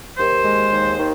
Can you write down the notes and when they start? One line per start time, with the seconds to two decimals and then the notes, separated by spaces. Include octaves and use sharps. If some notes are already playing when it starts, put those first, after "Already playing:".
0.18 D#2 C5
0.44 G#3
0.71 D#2
0.98 D#3